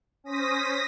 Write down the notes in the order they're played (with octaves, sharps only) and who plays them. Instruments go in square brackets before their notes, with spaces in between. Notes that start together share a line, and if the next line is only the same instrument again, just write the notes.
[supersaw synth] C#4 C5 [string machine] D#6 A#6 B6